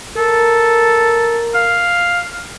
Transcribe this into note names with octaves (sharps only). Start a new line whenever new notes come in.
A4 A#4
F5